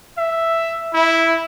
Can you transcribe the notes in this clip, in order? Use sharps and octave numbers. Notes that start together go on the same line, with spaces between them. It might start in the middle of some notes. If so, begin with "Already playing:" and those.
E5
E4